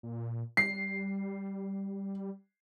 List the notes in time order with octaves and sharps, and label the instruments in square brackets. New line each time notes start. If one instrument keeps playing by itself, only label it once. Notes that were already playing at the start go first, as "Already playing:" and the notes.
[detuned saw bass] A#2
[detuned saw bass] G3 [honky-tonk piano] C7